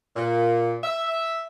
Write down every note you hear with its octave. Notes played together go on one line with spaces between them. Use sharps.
A#2
E5